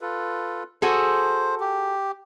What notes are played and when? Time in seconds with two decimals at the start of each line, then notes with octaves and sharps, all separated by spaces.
0.01 F4 A4 B4
0.82 F#4 G#4 A4 C5
1.60 G4